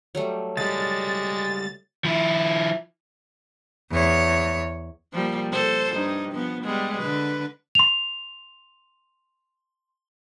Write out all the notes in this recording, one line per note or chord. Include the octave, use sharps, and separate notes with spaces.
F#3 G3 A3
C#2 G3 G#3 A5 A6
F3 E4
E2 C#5
F3 G3 A#3
A4 C5
G2 D#4
F3 B3
G3 G#3 B3
D3 B4
C6 F7